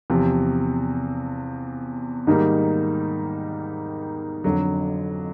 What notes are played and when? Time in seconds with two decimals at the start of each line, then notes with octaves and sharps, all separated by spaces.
0.10 E2 C3 F3
2.27 G#2 D#3 G3 A#3 D#4
4.44 F2 D3 F#3